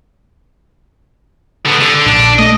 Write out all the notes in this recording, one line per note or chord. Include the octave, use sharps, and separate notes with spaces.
D3 B3
D3
A#1 D4
A3 D#5